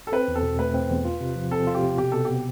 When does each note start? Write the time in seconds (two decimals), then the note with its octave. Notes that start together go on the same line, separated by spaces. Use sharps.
0.07 A4
0.12 C4 B4
0.28 E2
0.35 A4
0.43 B2
0.59 A3 B4
0.74 C4
0.90 E2
1.05 F4
1.21 C3
1.36 F3
1.51 C4 A4
1.67 F4
1.75 G4
1.83 C3
1.98 B2 G4
2.12 B2 A4
2.25 B3 G4